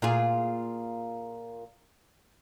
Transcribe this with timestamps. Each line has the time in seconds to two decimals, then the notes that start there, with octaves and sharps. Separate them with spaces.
0.02 A#2 F4 G#4